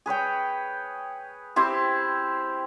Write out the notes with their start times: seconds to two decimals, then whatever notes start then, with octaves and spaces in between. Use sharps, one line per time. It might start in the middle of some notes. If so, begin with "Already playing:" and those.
0.06 G#4 B4 C#5 G5
1.56 C4 E4 G4 C5